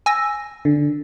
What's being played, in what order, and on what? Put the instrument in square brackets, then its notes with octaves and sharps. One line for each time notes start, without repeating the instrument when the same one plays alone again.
[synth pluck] G#5 E6 A#6
[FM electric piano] D3